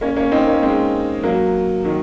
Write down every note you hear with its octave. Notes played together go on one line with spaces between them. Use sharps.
A#3 C#4
A#3 C#4
C4 D#4
A#3 C#4
G#3 C4
F#3 A#3
D#3 F#3